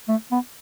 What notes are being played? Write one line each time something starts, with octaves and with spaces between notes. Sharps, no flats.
A3
B3